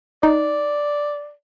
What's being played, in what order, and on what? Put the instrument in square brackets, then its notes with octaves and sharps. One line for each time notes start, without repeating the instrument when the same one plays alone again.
[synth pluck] D#4 [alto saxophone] D5